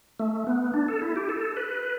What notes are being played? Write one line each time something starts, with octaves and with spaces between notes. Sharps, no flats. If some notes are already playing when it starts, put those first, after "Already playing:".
A3
B3
D4
A4
E4
G4
A4
B4